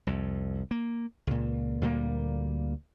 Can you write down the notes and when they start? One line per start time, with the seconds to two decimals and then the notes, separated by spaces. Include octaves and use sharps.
0.07 C2 F2
0.71 A#3
1.27 C#2 A#2
1.81 D2 A#2 G3 A#3